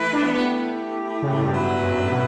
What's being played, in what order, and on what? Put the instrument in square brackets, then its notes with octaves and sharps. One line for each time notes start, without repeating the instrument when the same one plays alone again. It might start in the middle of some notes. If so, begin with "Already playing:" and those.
Already playing: [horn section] E3 A3 E4 B4
[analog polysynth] D4
B3
[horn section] A3 E4 G4 [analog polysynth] B3
[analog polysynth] C#3
A2
G2
[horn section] F#3 B3 E4 B4
[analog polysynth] F#2
G2
A2
B2